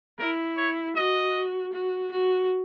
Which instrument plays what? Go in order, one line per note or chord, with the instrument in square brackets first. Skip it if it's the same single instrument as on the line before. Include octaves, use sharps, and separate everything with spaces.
[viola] E4 [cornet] A#4
[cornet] C#5
[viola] F#4 [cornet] D#5
[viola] F#4
F#4